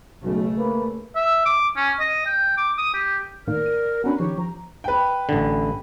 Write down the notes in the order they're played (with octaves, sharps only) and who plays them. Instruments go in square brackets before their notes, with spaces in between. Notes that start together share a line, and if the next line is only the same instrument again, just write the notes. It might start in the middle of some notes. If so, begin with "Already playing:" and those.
[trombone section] B1 [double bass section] C#3 A3
[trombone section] A#3 B4
[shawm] E5
D6
C#4
D#5
G5
D6
D#6
G4
[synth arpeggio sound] A2 D#3 A#3 [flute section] A#4 D5 F6
[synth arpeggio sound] D#7
[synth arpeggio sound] B3 C#4 D4 [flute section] F#4 A#5 B5
[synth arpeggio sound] D#3 F3 C7 [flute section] G4 C#5 C#6
[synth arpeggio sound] F3 [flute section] A#5
[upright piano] B4 G5
[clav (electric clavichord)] A1 D3